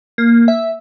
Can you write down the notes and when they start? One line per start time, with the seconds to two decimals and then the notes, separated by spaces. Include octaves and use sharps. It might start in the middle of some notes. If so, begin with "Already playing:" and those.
0.18 A#3
0.48 E5